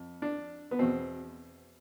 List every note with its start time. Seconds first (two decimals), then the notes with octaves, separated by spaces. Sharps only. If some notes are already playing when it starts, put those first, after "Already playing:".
Already playing: F2
0.22 D4
0.71 B3
0.79 E2 B2 C4